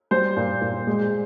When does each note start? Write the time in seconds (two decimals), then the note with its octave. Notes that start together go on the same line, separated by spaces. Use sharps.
0.11 G3 C5
0.37 A#2
0.61 A#2
0.87 G#3